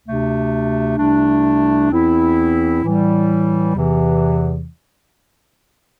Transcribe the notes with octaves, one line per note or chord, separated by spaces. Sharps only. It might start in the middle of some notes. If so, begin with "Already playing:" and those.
D2 C3 A3 D4
C2 C3 A3 D4
E2 E3 C4 E4
A2 E3 G3
E2 C3 E3